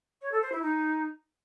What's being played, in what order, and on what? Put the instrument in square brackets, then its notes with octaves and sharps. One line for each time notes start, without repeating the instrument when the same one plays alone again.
[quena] C#5
A4
C5
E4
D#4